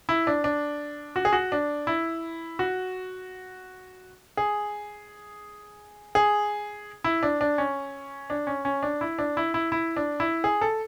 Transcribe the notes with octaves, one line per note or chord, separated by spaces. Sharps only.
E4
D4
D4
F#4
G#4
F#4
D4
E4
F#4
G#4
G#4
E4
D4
D4
C#4
D4
C#4
C#4
D4
E4
D4
E4
E4
E4
D4
E4
G#4
A4